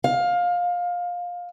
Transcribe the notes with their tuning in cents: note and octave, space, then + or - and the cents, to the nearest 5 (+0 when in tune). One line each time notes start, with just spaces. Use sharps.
F5 +20